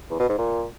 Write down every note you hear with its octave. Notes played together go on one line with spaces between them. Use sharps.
E2
B2
G#2
A#2